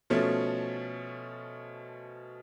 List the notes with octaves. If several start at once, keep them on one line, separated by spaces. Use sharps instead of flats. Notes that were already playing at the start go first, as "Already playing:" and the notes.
B2 F3 A3 C#4